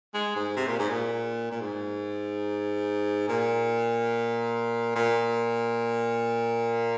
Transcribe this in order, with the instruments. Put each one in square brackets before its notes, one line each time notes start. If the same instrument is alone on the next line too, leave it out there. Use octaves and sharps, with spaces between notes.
[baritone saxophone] G#3
G#2
C3
A#2
G#2
A#2
A#2
G#2
A#2
A#2